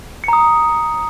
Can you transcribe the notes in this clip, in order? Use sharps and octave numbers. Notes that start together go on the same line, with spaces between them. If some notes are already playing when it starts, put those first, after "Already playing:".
A#5 D#6 C#7